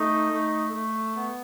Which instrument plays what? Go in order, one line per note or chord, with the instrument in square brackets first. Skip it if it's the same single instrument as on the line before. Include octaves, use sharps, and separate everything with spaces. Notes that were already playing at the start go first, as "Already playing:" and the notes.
Already playing: [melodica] A3 [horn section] D#4
[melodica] A3
A3
B3